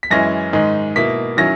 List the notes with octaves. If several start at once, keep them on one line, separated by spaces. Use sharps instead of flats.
B6
F#2 E3 G#3 C#4 E4 A#6
G#2 D#3 G#3 D#4
B2 A#3 E4 B6
D#3 F#3 C#4 E4 A#6